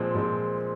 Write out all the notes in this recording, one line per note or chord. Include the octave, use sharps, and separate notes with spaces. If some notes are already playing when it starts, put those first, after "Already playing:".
Already playing: A#2 F3 G#3 C4
A#2 F3 G#3 C4